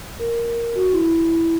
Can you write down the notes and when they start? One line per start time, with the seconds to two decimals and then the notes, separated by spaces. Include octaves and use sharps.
0.19 A#4
0.75 F#4
0.93 E4